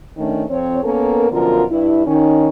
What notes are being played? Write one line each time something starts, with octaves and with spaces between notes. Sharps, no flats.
D#3 A3 C#4 D4
F2 C4 C#5
A#3 B3 C#4 A4 A#4
F#2 B2 D3 F3 F4 A#4
G2 E4
D#3 C#4 D#4